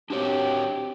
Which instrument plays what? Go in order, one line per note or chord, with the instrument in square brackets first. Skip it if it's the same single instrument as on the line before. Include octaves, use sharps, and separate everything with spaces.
[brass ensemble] C4 G4 [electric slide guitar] D4 F#4 C#5